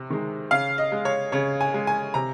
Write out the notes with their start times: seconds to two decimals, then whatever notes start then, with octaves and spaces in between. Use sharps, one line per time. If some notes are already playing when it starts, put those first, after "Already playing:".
Already playing: C3
0.10 D#3 G#3
0.51 C#3 F5
0.78 D#5
0.92 G#3
1.05 C#5
1.32 C#3 C#5
1.61 G#5
1.74 G#3
1.87 G#5
2.14 C3 A#5